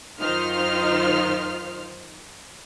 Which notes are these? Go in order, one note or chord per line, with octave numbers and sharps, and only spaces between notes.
F#2 D#3 D#4 F4 C5 F6